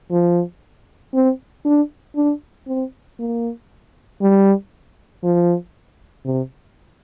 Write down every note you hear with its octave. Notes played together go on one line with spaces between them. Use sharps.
F3
C4
D4
D4
C4
A#3
G3
F3
C3